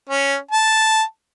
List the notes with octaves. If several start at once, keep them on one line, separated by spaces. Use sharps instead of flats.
C#4
A5